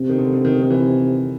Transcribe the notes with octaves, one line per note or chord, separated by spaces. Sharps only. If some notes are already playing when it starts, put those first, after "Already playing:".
Already playing: C3
D#3
D3
D3
D#3
D#3
E3